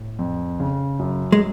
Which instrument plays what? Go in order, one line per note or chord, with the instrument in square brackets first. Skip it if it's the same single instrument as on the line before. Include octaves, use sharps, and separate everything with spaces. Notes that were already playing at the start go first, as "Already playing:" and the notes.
Already playing: [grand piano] A2
F2
C#3
F#2
[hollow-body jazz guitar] G#3